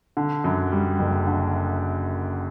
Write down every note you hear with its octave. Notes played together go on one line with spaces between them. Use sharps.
D3
F#2
G3
F#1
D3